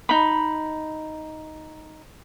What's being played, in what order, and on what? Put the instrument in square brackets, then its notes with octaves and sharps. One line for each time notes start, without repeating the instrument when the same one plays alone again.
[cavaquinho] D#4 B5